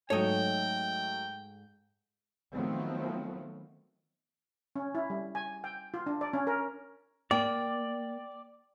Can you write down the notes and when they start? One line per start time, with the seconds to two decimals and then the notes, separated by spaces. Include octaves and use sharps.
0.10 G#2 F#3 A3 A4 C#5 D#5 G5
2.52 D#3 F3 F#3 A3 B3 C4
4.76 C#4
4.95 E4
5.10 G3
5.35 G#5
5.64 G5
5.94 F4
6.06 D4
6.21 D5
6.33 C#4
6.47 A#4
7.31 A#3 D5 G5